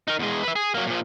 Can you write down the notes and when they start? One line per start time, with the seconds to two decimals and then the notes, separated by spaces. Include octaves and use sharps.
0.08 D#4 A#4
0.19 E2 G#3
0.43 B4 E5
0.56 G#4
0.75 F#3 A#3
0.87 A#2 F3